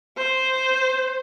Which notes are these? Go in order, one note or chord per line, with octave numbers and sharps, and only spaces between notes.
C5